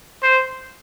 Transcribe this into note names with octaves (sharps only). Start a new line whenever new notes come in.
C5